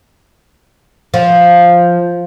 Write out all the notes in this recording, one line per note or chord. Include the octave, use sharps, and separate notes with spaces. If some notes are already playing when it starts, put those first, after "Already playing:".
F3